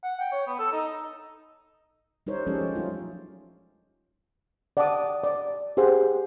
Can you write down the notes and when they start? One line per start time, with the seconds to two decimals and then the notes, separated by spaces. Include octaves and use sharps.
0.03 F#5
0.20 G5
0.32 C#5
0.47 B3
0.59 A4
0.72 D#4
2.27 G3 D#4 A#4 C5 C#5
2.47 F3 G#3 C#4 G4 A4 C5
2.61 F3
2.75 F#3 A3 D#4 F4
4.77 D5 F#5 G5 A5 D6 D#6
5.24 D5
5.77 G4 G#4 C5 F#5